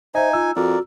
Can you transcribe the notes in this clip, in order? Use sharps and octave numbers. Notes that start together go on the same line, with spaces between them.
D#4 C5 D#5 E5 G#5
F4 E6
F2 F#4 A#4 D5